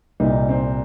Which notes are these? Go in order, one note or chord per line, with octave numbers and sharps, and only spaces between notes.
C2 A#2 D#4
C4